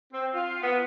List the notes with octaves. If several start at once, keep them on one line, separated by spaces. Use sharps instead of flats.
C4
F4
B3